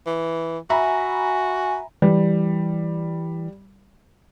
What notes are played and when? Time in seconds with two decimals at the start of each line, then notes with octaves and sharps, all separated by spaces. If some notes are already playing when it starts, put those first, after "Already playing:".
0.07 E3
0.70 F#4 E5 G#5 A#5 B5
2.02 E3 G3